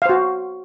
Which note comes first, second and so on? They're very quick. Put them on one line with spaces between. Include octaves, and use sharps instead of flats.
F5 C5 F#4